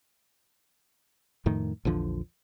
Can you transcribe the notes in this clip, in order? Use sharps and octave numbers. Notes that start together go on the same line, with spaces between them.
F2 A2 D#3
A#1 E2 D3 F3